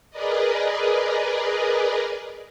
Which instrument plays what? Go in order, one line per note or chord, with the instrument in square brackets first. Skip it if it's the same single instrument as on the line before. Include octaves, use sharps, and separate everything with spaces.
[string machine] G#4 A#4 B4 D5 D#5